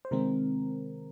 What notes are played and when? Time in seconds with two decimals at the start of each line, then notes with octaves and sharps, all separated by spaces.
0.05 C5
0.11 C3 D#3 G#3 C4 A#4